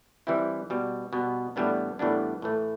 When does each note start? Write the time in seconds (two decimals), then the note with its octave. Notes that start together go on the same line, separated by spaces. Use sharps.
0.27 E3 G3 C4 E4
0.70 B2 G3 B3
1.13 B2 G3 B3
1.56 A2 E3 G3 B3 D4
1.99 A2 E3 G3 B3 D4
2.42 A2 E3 A3